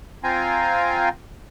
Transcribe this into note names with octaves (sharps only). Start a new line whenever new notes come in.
C4 F4 F5 G5 G#5 A#5